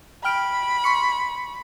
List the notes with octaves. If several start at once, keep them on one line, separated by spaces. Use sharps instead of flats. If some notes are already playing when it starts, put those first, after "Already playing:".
G5 B5 F6 D7
C6 C#6 C#7